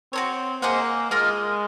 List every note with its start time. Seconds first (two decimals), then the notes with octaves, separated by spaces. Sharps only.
0.13 C4 F#4 A#4 C#5
0.62 A#3 G#4 C5 D#5 F#5
1.11 G#3 F4 A#4 D#5